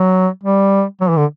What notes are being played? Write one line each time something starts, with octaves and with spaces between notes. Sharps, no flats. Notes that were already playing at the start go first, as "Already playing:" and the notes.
Already playing: F#3
G3
F#3
E3
D3